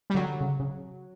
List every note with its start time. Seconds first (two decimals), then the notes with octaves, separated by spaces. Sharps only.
0.10 G3
0.15 D3 F#3
0.41 C#3
0.60 C#3